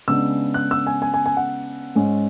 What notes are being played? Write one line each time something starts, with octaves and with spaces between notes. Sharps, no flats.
C#3 G#3 B3 D4 E6
F#6
E6
G#5
G#5
G#5
G#5
F#5
G#2 G#3 C#4